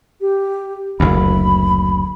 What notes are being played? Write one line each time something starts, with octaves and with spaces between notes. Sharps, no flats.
G4
F#1 D2 B5